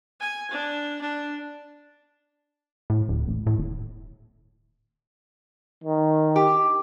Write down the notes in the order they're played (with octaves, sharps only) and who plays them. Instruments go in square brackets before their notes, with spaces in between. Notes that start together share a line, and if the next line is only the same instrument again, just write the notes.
[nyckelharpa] G#5
D4
D4
[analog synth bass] A2
D1
A1
A2
D#1
[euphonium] D#3
[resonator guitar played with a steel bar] G4